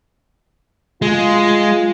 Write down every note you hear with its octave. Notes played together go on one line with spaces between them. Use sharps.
G#3 F4